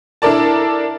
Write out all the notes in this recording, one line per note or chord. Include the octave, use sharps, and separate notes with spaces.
D4 E4 A4 A#4 D5 A5